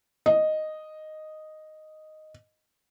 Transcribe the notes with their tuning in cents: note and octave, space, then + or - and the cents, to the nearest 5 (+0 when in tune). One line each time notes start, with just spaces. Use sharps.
D#5 -5